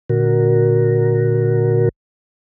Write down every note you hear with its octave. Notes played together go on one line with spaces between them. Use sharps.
A#2 D3 F#4 A#4